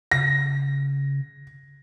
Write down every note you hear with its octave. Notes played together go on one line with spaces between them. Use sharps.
C#3 A#6